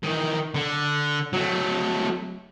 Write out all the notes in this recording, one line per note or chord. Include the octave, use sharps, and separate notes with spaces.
D#3 E3
D3
F#3 A3